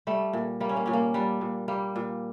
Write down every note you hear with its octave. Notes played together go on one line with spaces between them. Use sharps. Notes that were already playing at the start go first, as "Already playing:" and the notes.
G3 A3
A#2
G3 A#3
C#4
A#3
A#2 C#4
A#3
G3 D4
A#2
G3 A#3
A#2